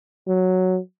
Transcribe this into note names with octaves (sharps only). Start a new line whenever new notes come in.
F#3